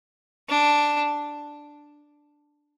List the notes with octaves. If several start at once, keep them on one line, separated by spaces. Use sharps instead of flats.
D4